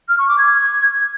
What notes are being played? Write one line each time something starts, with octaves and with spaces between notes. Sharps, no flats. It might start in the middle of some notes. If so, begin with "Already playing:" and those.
F6
C#6
D6
G#6